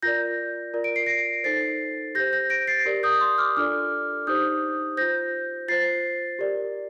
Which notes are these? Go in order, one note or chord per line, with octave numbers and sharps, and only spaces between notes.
F4 A#4 D5 G6 A#6
F4 A#4 D5
D7
C7
A#6 D7
D#4 A4 C5 A6 C7
G4 C5 G6 A#6
G6 A#6
A#6 D7
A6 C7
G4 A#4 D5
D#6 G6
C6 D#6
D6 F6
D4 F4 A4 D5 D6 F6
D#4 G4 C5 D#6 G6
F4 C5 G6 A#6
F4 C5 A6 C7
G4 A#4 D5